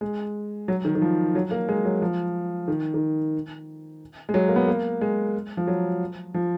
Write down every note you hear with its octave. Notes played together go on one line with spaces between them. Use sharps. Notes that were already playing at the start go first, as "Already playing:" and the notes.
G#3
F#3
D#3
D#3
F3
F#3
A#3
G#3
F#3
F3
D#3
D#3
G#3
F#3
A#3
B3
A#3
G#3
F3
F#3
F3